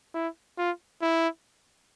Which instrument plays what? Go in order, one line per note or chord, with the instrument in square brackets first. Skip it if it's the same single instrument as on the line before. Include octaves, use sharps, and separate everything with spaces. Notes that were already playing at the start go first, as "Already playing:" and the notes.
[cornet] E4
F4
E4